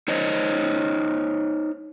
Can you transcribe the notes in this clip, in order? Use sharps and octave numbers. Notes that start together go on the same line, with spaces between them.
D#4 C5 C#5 D#5